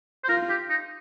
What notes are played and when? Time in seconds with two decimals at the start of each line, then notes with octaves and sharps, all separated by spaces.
0.24 C5
0.29 F4 A#4
0.49 G4
0.70 D#4